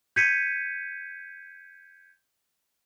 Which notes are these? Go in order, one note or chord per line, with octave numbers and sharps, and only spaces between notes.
G6 G#6 B6 C#7 D#7